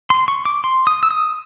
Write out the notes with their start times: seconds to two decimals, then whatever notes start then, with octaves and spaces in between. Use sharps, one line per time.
0.10 C6
0.28 C#6
0.45 D6
0.64 C6
0.87 D#6
1.03 E6
1.11 D#6